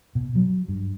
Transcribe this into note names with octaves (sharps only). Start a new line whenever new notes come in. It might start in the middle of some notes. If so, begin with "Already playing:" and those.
B2
F#3
G2